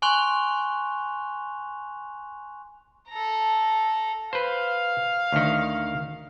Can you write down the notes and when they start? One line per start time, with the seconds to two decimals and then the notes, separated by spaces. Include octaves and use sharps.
0.02 G#5 C6 C#6 F#6 F7 G7
3.09 A4 A#5
4.33 B4 C5 F5
5.32 D2 D#3